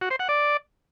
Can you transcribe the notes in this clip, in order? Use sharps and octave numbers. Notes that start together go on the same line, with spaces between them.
F#4
C5
F#5
D5